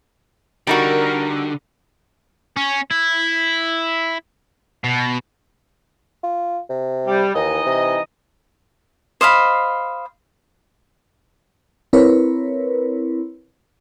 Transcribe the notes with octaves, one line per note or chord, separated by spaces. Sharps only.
D3 G3 D#4 F#4 A#4
C#4
E4
B2
F4
C3
G3
D#2 E3 D#4 D#5
C3
C5 D#5 F5 B5
C4 E4 A#4 B4 C#5